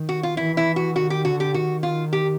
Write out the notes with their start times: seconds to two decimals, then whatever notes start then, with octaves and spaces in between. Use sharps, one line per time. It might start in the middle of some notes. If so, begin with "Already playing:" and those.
Already playing: D#3
0.09 F#4
0.23 F4
0.37 E3 E4
0.57 E4
0.76 F#4
0.96 D#3 F#4
1.10 G4
1.25 D3 F#4
1.40 G4
1.54 D#3 F#4
1.83 F4
2.13 G4